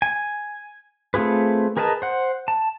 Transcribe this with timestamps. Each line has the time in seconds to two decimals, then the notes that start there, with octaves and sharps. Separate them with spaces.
0.02 G#5
1.14 A3 C4 F4 G#4 B4
1.77 G#4 A#4 B4 D#5 A5
2.02 C5 F#5
2.48 A5